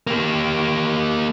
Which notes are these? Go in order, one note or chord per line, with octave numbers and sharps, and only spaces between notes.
A#3 G4